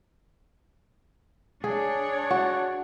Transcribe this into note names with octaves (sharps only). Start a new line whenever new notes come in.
D4 G#4 C#5
F#4